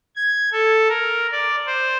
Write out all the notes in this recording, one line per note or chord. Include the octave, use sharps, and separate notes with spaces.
G#6
A4
A#4
D5
C5